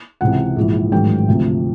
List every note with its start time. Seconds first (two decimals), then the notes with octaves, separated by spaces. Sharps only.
0.21 C#2 C3 E3 F#5
0.56 A#1 G#2 E3
0.92 A1 G#2 D#3 F#3 G5
1.28 D2 C3 F3